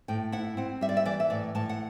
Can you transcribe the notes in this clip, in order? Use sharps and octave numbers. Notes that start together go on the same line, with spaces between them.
A2 G5
E4 F#5
C4 F#5
G3 E5
D5
E5
E3 D5
E5
A2 D5
A2 A5
F#5